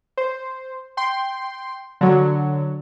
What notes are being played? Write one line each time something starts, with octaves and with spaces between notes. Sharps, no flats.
C5
G5 C6
D3 F#3